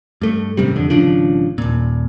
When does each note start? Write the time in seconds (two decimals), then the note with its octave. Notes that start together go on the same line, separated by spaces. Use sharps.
0.22 G2 A3
0.57 G#1 F#2 C3 G3
0.76 F2 D3
0.90 G#1 C#3 F3 D4
1.58 D#1 A#2